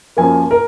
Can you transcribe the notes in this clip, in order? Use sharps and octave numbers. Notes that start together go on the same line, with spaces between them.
F#2 F3 A#3 G#5
A#4